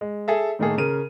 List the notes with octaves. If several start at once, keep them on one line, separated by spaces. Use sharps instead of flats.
G#3
G#4 A4 E5
A2 D#3 A3 A#3 G#4 A4
C#3 A#4 D#7